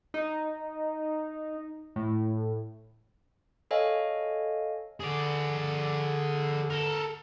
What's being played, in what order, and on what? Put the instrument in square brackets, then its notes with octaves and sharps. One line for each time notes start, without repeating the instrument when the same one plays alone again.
[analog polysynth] D#4
A2
[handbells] A4 C#5 D#5 F5 G#5
[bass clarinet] D3 [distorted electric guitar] G#4 D5
[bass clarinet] D3
[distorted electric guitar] A4 A#4